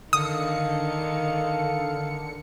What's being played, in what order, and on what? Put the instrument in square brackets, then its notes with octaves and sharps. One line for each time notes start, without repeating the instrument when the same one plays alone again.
[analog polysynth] D3 C#7 [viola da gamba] D#3 [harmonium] A4 F5 [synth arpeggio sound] D#6